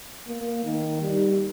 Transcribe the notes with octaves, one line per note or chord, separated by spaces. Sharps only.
A#3
D#3
G3